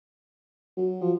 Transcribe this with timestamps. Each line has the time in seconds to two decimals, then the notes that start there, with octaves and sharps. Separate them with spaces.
0.77 F#3
1.02 F3